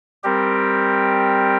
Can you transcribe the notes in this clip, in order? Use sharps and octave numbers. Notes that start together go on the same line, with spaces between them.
G3 C4 G4 A#4